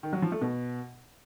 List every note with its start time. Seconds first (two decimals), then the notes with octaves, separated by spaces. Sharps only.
0.03 D#3
0.13 F#3
0.22 F3
0.32 A3
0.41 B2